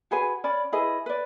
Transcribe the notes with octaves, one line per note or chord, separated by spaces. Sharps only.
F#4 G#4 B4 G#5
C#4 D5 B5
E4 G#4 B4 D#5
B4 D5